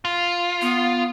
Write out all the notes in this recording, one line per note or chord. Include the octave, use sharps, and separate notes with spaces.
F4
B3